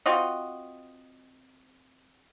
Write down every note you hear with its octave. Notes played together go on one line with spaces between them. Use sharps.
C4 F4 F#4 D#5